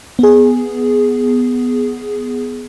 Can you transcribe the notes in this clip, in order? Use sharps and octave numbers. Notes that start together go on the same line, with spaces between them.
B3 G#4